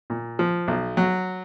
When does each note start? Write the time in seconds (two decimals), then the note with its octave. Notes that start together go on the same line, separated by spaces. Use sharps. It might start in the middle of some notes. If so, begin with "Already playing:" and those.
0.10 A#2
0.39 F3
0.68 B1
0.97 F#3